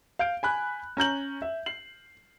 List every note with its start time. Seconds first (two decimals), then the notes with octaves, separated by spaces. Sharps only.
0.19 F5 G6 D7
0.43 G#5 B5 F#6
0.97 C#4 A#5 G6 F#7
1.42 E5
1.66 C7 F#7